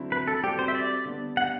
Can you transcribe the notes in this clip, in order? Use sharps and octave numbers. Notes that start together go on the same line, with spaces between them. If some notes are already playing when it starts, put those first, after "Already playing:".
Already playing: D3 F#3 C4 E4
B4
A4
G3 C4 F#4 G4 A4
C5
E5
D5
D3 G3 B3
F#5